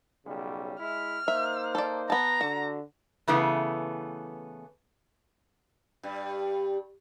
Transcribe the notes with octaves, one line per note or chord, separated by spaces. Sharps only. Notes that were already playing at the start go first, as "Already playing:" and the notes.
B1 C#3 G3
G#3 E4 F6
A#3 D#4 C5 E5
A4 D5
B3 A5 A#5
D3 F#4
C#3 E3 A3 B3
G2 G3